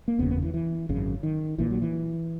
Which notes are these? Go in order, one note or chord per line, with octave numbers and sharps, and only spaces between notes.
A#3
F#1 E2 C#3 B3
B3
E3
E3
G#1 F#2 C#3
D#3
A#1 A#2 E3
F#3
E3